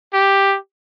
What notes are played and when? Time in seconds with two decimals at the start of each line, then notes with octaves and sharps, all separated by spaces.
0.14 G4